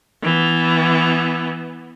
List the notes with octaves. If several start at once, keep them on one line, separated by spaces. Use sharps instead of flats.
E3 B3